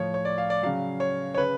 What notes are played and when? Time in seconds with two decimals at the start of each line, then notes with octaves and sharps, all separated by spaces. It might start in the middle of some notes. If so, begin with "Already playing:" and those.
Already playing: A2 F3 C#5
0.14 C#5
0.25 D5
0.38 F5
0.50 D5
0.63 C#3 F#3 F5
1.00 C#5
1.34 C#5
1.38 C#3 B4